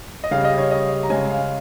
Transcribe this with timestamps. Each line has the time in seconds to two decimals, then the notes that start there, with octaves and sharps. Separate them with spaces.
0.24 D#5
0.31 C#3 G3 F5
0.44 D#5
0.58 C#5
0.71 D#5
1.03 A#5
1.10 C#3 G#3 G#5
1.30 F5